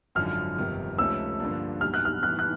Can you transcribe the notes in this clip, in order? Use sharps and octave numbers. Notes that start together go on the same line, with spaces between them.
G#1 F#2 D3 F3 F6
G1 F2 C3 D#3
C#2 C3 F3 A3 C#4 E6
G2 D3 F3 A#3 D4
B1 B2 G3 F6
F#6
F6
A2 E3 G3 B3 F#6
F#6